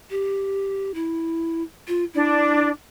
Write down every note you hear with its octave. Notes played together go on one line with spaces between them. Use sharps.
G4
E4
F4
D4 E4